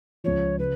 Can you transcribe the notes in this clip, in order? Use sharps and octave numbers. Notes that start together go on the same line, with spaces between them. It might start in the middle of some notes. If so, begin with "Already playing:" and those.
C#2 C#3 F3 C#5
C#3 B4